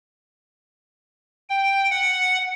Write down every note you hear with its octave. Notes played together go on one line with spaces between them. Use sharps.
G5
F#5